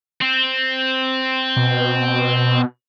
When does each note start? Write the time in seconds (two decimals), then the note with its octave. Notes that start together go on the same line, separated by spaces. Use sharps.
0.22 C4
1.56 B2